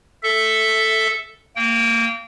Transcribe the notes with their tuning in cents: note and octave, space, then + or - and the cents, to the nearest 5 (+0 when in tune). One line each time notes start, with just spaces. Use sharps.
A4 +0 E5 +0
A#3 -25 G5 -20